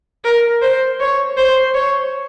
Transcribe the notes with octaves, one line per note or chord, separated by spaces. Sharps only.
A#4
C5
C#5
C5
C#5